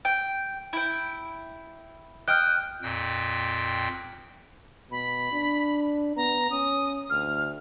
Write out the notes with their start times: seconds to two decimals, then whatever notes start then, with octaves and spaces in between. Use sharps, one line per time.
0.05 G5
0.73 E4 G5
2.28 D#5 G5 F6 F#6
2.82 F2 A#2 G5
4.91 B2 B5
5.33 D4
6.16 B3 A#5
6.51 C#4 D#6
7.10 D2 F6